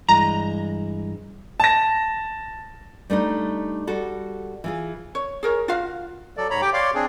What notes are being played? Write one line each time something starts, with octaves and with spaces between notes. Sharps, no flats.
G2 E3 G#3 A#5
A5 A#6
G3 A3 D4 D#4
G3 F#4 A4
E3 F4 G#4
C#5
G#4 A#4 C#5
F4 F#4 F5
F#3 A4 D5
G#2 C#5 A#5 B5
G4 G5 D6
C#5 D5 F5 C6 D6
C4 D4 G#4